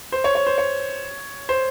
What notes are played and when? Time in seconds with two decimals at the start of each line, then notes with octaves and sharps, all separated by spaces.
0.12 C5
0.24 C#5
0.35 C#5
0.47 C5
0.58 C#5
1.49 C5